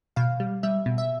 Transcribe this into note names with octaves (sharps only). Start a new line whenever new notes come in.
B2 F5
G3
G3 E5
B2
E5